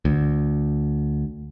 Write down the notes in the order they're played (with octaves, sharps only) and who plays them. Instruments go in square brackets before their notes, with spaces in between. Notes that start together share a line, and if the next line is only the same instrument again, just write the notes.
[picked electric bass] D2